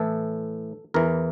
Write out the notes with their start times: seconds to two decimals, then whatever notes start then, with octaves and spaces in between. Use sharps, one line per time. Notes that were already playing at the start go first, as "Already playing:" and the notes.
Already playing: A2 E3 A4
0.94 E2 E3 A#4